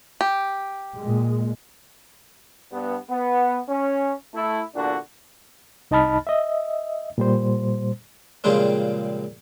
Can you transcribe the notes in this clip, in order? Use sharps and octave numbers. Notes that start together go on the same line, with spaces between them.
G4
A#2 G#3
G2 B3
B3
C#4
A3 E4
E2 A#2 D3 D4 F#4
C2 D#4 D#5 A5 B5 F6
D#5 E5
A#2 G3 C5
A#2 C#3 F3 G3 G#3 C4